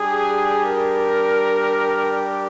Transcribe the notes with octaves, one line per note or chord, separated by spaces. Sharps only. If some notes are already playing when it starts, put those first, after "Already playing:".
Already playing: G3 D4 G4 G#4
A#4